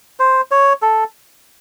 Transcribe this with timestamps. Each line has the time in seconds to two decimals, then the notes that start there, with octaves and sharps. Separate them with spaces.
0.19 C5
0.51 C#5
0.82 A4